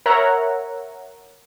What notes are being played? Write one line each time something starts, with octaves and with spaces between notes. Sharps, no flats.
A#4 C#5 E5 F#5 A#5